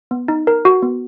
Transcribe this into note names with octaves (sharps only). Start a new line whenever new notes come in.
B3
D#4
A#4
F#4
B3